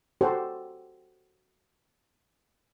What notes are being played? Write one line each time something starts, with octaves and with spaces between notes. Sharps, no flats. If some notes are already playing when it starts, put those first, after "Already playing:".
F#4 G4 A4 C5